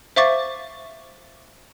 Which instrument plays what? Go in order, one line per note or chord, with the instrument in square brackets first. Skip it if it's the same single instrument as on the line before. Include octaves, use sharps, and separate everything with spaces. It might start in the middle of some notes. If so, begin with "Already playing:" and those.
[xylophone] C5 E5 F5 C#6 D6 A6